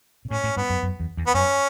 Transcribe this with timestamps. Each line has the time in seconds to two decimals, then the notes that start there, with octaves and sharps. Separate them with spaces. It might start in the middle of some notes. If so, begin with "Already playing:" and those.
0.25 B2
0.31 A2 C#4
0.44 A2
0.56 G2 B3
0.70 F#2
0.83 F#2
1.00 E2
1.17 E2
1.27 B3
1.34 F#2 C#4